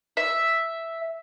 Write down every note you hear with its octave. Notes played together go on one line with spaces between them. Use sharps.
E5